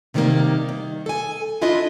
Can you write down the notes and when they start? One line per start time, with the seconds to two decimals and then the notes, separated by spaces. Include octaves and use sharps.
0.14 C3 D#3 G3 G#3 A#3
0.69 D#3
1.06 A4 G#5
1.62 D4 E4 F4 A4 D#5